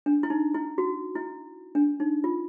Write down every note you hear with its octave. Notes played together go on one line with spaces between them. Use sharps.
D4
E4
D#4
E4
F#4
E4
D4
D#4
F4